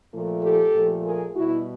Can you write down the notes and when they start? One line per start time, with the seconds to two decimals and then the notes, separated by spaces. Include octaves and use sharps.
0.10 A#2 F3 A3
0.41 G4 A4
0.72 A#2 F3 A3
1.04 G#4 A#4
1.34 B2 G3 E4 F#4